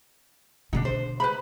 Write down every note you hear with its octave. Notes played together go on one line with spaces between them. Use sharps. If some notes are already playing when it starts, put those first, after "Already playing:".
B2 D3 D4 D#4
C5
B4 C5 B5